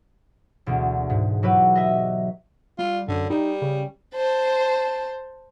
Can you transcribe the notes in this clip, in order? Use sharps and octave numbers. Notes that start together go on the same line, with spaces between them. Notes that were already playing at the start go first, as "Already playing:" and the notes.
E1 D2
G#2
F#3 E4 G4 B4
D#5 E5
G3 F4
F#2 D3
G3 D#4
C#3
C5 A5